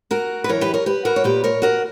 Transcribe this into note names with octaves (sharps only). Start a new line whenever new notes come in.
F#4 A#4
B4
F#2 E3 A#4 C#5
G4 B4
A#4 C#5
G4 B4
F#4 A#4
C#5
A#2 G4 B4
A#4 C#5
F#4 A#4